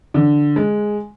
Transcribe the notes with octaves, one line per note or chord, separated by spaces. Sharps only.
D3
G#3